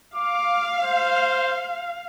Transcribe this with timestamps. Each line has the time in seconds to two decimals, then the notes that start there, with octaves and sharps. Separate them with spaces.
0.15 F5 D6
0.83 C5